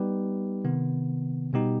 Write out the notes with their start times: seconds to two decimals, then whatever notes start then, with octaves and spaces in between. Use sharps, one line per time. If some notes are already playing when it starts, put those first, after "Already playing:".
Already playing: G3 B3 D#4 G4 B4
0.65 C3 D#3 B3
1.53 B2 G3 B3 D#4 G4